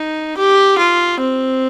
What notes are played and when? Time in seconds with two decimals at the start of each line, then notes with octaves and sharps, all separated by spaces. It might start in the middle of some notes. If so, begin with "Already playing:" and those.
Already playing: D#4
0.37 G4
0.78 F4
1.20 C4